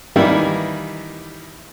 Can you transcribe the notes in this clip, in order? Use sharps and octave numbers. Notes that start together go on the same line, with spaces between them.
D#3 E3 G3 A#3 D#4 E4